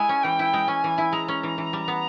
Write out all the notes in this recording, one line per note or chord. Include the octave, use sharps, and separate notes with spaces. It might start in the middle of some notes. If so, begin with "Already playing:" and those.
Already playing: G#3 E4 G#5
C#4
E3 G5
E4
G#3
C#4 G#5
E3
E4
G#3 A#5
C#4
E3
E3
G3
B3